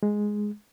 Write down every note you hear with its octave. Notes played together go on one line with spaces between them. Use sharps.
G#3